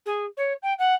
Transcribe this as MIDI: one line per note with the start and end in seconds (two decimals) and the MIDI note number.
0.06 0.25 68
0.37 0.53 73
0.63 0.74 79
0.79 0.95 78